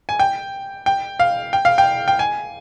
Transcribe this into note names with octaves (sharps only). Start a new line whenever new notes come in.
G#5
G5
G5
F5
G5
F5
G5
G5
G#5